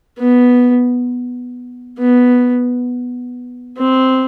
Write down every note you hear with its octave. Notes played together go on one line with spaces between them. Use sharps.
B3
B3
C4